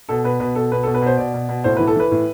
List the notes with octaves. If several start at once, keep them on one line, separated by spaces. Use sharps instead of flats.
B2 A4
B2 B4
B2 B4
B2 A4
B2 B4
B2 A4
B4
B2 C5
B2 D5
B2
B2
A2 C5
E3 B4
A4
E3 B4
A2